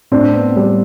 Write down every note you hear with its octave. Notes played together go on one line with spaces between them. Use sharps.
A2 C4 D4
B3
G3